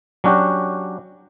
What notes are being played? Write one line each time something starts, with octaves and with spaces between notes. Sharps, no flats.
F#3 C#4 D4 F#4 G4